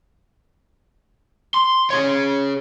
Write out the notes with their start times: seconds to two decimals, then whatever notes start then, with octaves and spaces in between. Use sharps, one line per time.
1.54 C6
1.90 G#4 C#5